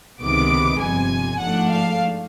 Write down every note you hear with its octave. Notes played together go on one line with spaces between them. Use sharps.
C#2 C3 D#3 G#3 B3 D6
G1 F2 C3 G#5
G#2 F3 A3 D4 F#5
F5